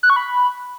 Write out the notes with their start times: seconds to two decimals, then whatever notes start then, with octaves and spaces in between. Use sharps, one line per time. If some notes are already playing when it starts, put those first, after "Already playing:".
0.03 F#6
0.10 C#6
0.16 B5